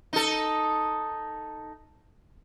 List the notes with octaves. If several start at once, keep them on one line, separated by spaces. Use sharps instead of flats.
D#4 A4